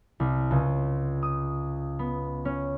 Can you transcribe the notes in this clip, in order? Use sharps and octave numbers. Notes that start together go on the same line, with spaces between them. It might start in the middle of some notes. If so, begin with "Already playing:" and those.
C2
C#2
D#6
B3
C#4